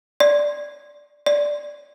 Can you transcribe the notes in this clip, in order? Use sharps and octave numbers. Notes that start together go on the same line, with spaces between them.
D5
D5